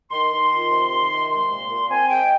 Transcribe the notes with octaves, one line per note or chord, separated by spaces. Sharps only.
D#3 C6
D#3
F4
C3
D#3
C3
G#3 C6
A#2
A#2
C4 G#5
G#3 G5